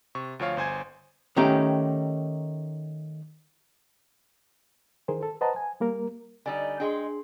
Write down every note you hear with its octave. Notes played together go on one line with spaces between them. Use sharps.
C3 C#6
D2 F3 C#5 F5
G1 C5 G#5 G#6
D#3 A3 C#4 D#4 G4
D#3 E3 G#4 A#4 C5
A4
B4 C5 D#5 F#5 A5 A#5
G#5
G3 A#3 A#4
D3 G3 D#4 D#5 G#5
G#3 D4 G#4 G5 C6